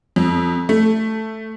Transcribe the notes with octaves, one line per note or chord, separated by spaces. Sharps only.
F2
A3